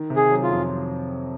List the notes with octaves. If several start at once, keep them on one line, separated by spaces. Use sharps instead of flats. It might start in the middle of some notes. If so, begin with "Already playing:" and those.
Already playing: D#3
C3
G#4
F#3
F4
F2